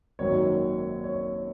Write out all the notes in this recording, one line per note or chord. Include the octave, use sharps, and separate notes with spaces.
G#1 F#2 D#3 F#3 A#3 C#5
C#5